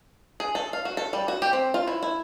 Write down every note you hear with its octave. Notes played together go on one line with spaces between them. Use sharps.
G#4
A4
F5
F#4
A4
G3
F#4
G4
C4
F4
E4
E4